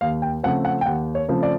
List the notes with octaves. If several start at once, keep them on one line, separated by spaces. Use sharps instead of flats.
D#2 F5
G5
C#3 F3 A3 C4 F#5
F#5
G5
D#2 F#5
C#5
C#3 F3 A3 C4
D5